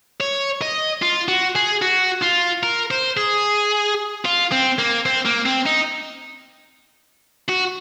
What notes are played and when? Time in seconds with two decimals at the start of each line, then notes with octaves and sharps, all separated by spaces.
0.21 C#5
0.61 D#5
1.02 F4
1.28 F#4
1.55 G#4
1.82 F#4
2.23 F4
2.63 A#4
2.91 C5
3.17 G#4
4.26 F4
4.52 C4
4.78 A#3
5.05 C4
5.26 A#3
5.46 C4
5.66 D#4
7.49 F#4